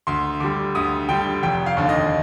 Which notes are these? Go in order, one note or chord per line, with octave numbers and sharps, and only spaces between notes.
D2 C6
D3 G3 D6
D2 D#6
D3 G3 G5
F1 G5
F5
D#2 D3
D#5